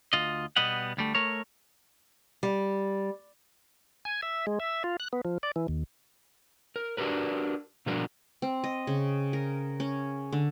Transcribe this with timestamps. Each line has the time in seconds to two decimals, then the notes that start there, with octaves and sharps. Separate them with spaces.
0.13 D2 F4 D#5
0.56 B2 G3 B3 D#5 F#5
0.97 D2 G3 A3
1.15 A3 A#4 C#5
2.43 G3
4.05 G#5
4.22 E5
4.47 G#3
4.60 E5
4.84 F4
5.00 F#6
5.13 B3
5.25 F3
5.43 D5
5.56 E3
5.68 D#2
6.76 A#4
6.97 D4 F#4 G4 A#4 B4
7.86 B2 F3 G3 D4 F#4 A#4
8.42 C4
8.64 D#5
8.87 C#3
9.33 A#4
9.80 C#4
10.33 D3